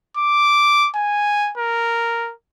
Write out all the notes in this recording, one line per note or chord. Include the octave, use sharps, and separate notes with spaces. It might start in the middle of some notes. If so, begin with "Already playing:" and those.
D6
G#5
A#4